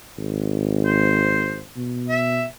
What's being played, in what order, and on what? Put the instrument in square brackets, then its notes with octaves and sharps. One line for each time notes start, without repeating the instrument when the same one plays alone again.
[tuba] G#1
[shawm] C5
[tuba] B2
[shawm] E5